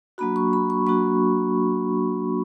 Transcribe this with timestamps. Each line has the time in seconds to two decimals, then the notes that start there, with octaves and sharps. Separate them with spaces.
0.18 F#3 A#3 D4 F#4 B5
0.36 C#6
0.53 B5
0.70 C#6
0.86 F#3 A#3 D4 F#4 C#6